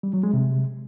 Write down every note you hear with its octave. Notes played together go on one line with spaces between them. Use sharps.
G3
F#3
G#3
C3